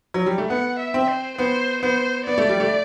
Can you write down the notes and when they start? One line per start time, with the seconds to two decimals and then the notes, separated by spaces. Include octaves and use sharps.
0.14 F#3
0.26 G3
0.38 A3
0.49 B3 F#5
0.80 E5
0.94 C4
1.09 C5
1.38 B3 C5
1.83 B3 C5
2.26 B3 D5
2.38 A3
2.49 G3
2.60 A3